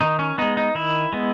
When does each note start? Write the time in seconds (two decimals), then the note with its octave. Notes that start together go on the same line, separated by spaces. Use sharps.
0.01 D#3 D#4
0.19 C#4
0.38 G#3 B3 D#4
0.57 D#4
0.75 D#3 E4
1.13 G#3 B3